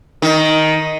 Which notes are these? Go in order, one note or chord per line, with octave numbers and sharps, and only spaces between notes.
D#3